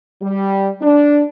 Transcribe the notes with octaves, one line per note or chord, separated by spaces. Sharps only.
G3
D4